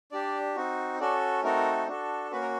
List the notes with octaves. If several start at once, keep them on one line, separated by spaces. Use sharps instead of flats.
D4 G4 D5
C4 D#4 F#4
C#4 F#4 A4 D5
A3 C4 D#4 F#4 A4 A#4
D4 F#4 A4
A#3 C#4 F#4 B4
A#4